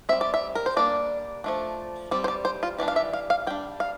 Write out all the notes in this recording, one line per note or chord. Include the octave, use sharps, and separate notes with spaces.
G3 C4 E5
D5
E5
A#4
C5
G3 A#3 D4 D5
F3 A3 D4
G3 C4 D5
C5
D5
C5
F4
E3 G3 D4 D5
F5
E5
F5
F5
G3 D4 G5
F5